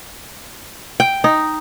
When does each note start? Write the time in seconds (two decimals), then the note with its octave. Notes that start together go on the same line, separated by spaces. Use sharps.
1.00 G5
1.24 D#4